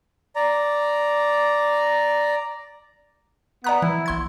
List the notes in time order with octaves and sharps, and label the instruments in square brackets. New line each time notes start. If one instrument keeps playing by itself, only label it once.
[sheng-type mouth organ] D5 A#5
[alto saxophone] B3 [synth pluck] D5 A#5 F#6
[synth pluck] E3 [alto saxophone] E4
[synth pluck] A#1 C6 G#6